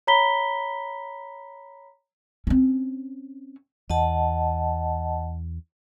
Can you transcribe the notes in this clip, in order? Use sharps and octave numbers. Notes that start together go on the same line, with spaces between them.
C#5 A#5 B5 B6 G7
C4 C#4
E2 D#5 F#5 A5